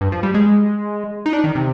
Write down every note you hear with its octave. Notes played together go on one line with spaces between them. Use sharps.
G2
F3
G3
G#3
D#4
D4
D#3
C3